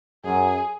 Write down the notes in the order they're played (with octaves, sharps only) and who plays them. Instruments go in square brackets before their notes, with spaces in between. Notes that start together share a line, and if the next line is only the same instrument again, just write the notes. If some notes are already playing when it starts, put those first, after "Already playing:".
[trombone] F#2 [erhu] G#4